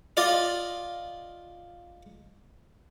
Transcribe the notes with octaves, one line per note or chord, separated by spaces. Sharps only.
F4 D5 D#5